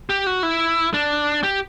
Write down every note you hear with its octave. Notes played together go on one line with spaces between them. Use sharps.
G4
F#4
E4
D4
G4